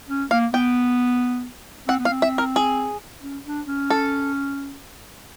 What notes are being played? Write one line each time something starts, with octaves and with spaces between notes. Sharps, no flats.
C#4
A#3 F5
B3 G5
C4 F#5
B3
F5
C4
E5
A#4
G#4
C#4
D4
C#4
A4